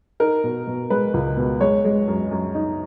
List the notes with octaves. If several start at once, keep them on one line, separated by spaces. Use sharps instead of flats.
D#4 A#4
B2
B2
G#3 B4
C#2
B2
G#3 C#5
G#3
F#2
F#2
D#4